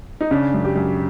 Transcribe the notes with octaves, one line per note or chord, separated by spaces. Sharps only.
D#4
C#3 D4
F#2
G4
F#2